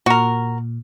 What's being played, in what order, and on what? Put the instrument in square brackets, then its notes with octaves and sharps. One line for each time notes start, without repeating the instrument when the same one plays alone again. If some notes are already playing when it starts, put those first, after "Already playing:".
[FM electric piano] A#2 [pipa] F#4 A#4